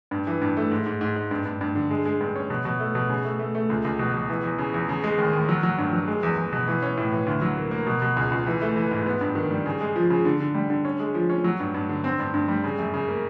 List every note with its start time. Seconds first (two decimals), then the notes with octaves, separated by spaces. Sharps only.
0.11 G2
0.27 E3
0.42 G2
0.57 A3
0.71 G#2
0.86 G#2
1.01 G#2
1.16 G#2
1.31 G2
1.45 G2
1.61 G2
1.75 D3
1.90 G#3
2.06 G#3
2.20 G2
2.35 C#4
2.50 B2
2.65 B2
2.79 A3
2.95 B2
3.10 C#3
3.25 A3
3.39 A3
3.55 A3
3.70 C#2
3.85 C#2
3.99 B2
4.14 B2
4.29 E3
4.44 E2
4.58 C#3
4.74 E2
4.89 C#3
5.04 G#3
5.18 D#2
5.33 D#2
5.49 F#3
5.63 F#3
5.78 G2
5.93 F#3
6.08 G#3
6.23 E2
6.38 E2
6.53 B2
6.67 E3
6.82 C#4
6.97 A2
7.12 E3
7.27 D2
7.42 F#3
7.57 A#3
7.71 A#3
7.87 B2
8.02 B2
8.17 C#2
8.32 C#2
8.46 E3
8.62 A3
8.76 E3
8.91 G#2
9.06 B3
9.21 G2
9.35 D#3
9.51 G3
9.66 C#3
9.81 G#3
9.96 F3
10.10 C#3
10.25 D3
10.40 D3
10.55 G3
10.70 D3
10.85 C#4
11.00 G#3
11.14 F3
11.29 C#4
11.44 F#3
11.60 G2
11.74 G2
11.89 D3
12.04 C4
12.20 G2
12.34 G2
12.48 G3
12.64 C#3
12.78 F#2
12.94 C#3
13.08 A#3